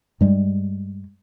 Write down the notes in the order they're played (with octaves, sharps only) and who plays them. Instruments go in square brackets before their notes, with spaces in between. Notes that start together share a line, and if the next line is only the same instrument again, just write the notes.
[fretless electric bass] G2 G3 G#3